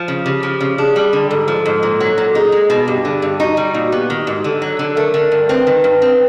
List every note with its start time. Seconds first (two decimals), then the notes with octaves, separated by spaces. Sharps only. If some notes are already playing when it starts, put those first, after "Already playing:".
Already playing: F3
0.08 C#3
0.25 C#3 G4
0.43 F3
0.61 C#3
0.78 D4 G#4
0.96 G3
1.13 D3
1.30 G#2 A4
1.48 F3
1.66 G#2
1.83 A#2
2.00 F#3
2.18 A#2
2.35 D#4 G#4
2.52 G#3
2.70 B2
2.87 G2 G4
3.05 D3
3.22 G2
3.40 D#4 F#4
3.57 G3
3.75 A#2
3.92 B3 G4
4.10 D#3
4.27 G#2
4.44 D3 A4
4.62 F#3
4.79 D3
4.97 A3 A#4
5.14 D3
5.32 G2
5.49 C4 B4
5.67 D#3
5.84 G2
6.02 C4